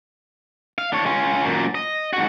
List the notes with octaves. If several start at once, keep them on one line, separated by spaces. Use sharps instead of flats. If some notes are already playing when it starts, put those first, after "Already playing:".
F5
D4 C#5
C#4 F4
F#2 A#2
D#5
G#2 F#4